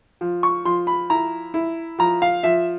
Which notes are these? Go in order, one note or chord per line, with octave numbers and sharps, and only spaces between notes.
F3
C#6
F3 C6
B5
E4 A#5
E4
F3 A#5
F5
F3 E5